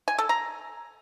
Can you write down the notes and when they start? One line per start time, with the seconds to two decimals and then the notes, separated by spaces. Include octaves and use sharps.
0.08 G#5
0.18 A4
0.29 A#5